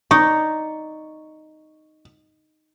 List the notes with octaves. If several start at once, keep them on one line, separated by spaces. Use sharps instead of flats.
D#4 D5 C#6